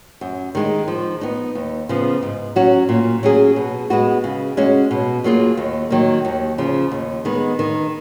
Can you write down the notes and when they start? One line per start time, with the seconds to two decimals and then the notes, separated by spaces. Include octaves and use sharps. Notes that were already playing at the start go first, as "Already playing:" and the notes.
0.21 F#2
0.55 D#3 G#3 D#4
0.88 F3
1.21 B3 D#4
1.55 D#2
1.89 C#3 F3 B3
2.23 G#2
2.56 F#3 C#4 F#4
2.89 A#2
3.23 F#3 C#4 G#4
3.56 B2
3.90 G#3 B3 F#4
4.24 C#3
4.57 G#3 C#4 F#4
4.91 B2
5.24 F#3 A#3 F4 G#4
5.57 D#2
5.90 D#3 F#3 A#3
6.25 D#2
6.58 C#3 F3
6.92 D#2
7.25 D#3 G#3 B3
7.59 D#3